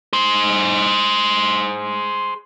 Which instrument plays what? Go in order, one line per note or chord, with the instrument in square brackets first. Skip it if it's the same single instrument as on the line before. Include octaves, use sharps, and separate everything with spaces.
[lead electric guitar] G#4 C5